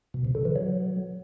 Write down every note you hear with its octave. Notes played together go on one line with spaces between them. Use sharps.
B2
C3
D3
E3
F#3